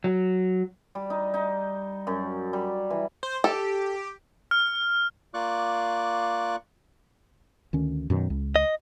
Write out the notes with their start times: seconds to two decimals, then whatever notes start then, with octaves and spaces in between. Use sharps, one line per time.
0.04 F#3
0.95 G3
1.10 D#4
1.34 D#4
2.07 F#2
2.53 G3
2.90 E3
3.23 C5
3.44 G4 A4
4.51 F6
5.34 A#3 F4 D5 C#6 D6 F#6
7.73 D2 D#3 C#4
8.10 F#2 B2 D#3
8.30 C#2
8.56 D#5